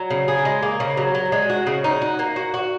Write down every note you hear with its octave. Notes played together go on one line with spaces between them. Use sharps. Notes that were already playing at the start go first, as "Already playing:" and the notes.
Already playing: F#3
C#3
G#4
G#3
A#3
C#3
F#3
F#3
G#3
F#4
C#3
D#4
F#4
A#3
F#4
F#4